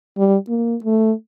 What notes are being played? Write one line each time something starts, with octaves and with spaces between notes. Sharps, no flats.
G3
A#3
A3